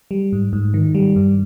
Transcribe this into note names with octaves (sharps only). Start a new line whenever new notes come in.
G3
G#2
G#2
D#3
G3
G2